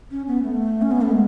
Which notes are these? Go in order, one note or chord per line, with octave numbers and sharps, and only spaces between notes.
C#4
B3
A3
C#4
B3
A3
G#3